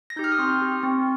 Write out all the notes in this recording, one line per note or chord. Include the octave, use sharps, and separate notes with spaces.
A#6
D#4 G4 G6
F6
D#6
C4 C6
G4
C4